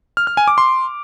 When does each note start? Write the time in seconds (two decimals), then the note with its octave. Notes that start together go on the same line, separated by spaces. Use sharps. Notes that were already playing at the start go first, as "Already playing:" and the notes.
0.17 F6
0.27 F6
0.37 G#5
0.48 D6
0.58 C6